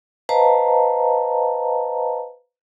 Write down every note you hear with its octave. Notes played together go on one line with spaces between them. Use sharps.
B4 C5 D#5 F5 A5 A#5